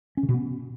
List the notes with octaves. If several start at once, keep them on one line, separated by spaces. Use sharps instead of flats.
C#4
C#3
B2
B3